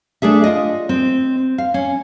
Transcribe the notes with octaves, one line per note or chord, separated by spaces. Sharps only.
A3 D4 G#4 E5
F4 D#5
C4
F5
C#4